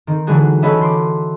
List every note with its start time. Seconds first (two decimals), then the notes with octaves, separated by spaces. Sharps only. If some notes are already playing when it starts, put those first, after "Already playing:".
0.07 D#3 C4
0.27 D3 E3 F#3 G#3 F#4 G#4
0.62 C#4 A4 B4 C#5 D#5 E5
0.82 C6 D6